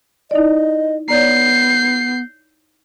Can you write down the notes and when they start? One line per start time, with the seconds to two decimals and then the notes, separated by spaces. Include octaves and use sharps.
0.31 D#4 E4 D5 D#5
1.08 B3 C#5 D5 A#5 G6 C7